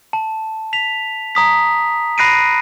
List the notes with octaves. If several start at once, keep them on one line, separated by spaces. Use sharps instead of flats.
A5
B6 F7
A#5 D#6 B6
B5 F#6 A#6 C7 D7 D#7